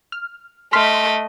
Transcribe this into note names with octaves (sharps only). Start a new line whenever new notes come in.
F6
A3 D#5 C6 F6 B6